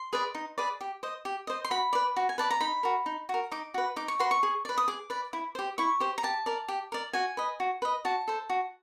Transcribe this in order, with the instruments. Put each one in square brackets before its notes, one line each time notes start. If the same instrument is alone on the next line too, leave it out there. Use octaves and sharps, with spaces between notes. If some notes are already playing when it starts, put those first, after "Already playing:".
Already playing: [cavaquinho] C6
G#4 B4 D5
D#4
G#4 B4 D5
G4
C5 D#5
G4
C5 D#5
C6
F#4 B5
B4 D5
F#4
G#5
B4 D5 A5
A#5
D#4 B5
F#4 A#4
D#4
F#4 A#4
D#4 D6
F#4 B4
D#4 D6
C#6
F#4 B4 C6
C#6
G#4
B4 D5
D#6
G#4 D6
B4 D5
E4
G4 C5
E4 C#6
G4 C5
A#5
G4 A5
A#4 D5
G4
A#4 D5
F#4 G#5
B4 D#5
F#4
B4 D#5
F#4 A5
A4 C5
F#4